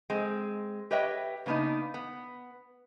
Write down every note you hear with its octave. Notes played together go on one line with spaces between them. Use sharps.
G#3 C4
G4 B4 C#5 D#5 E5 G5
C#3 A#3 B3 D4 D#4
B3